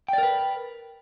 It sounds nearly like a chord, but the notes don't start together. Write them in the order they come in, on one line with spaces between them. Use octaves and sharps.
G5 D5 A#4 B4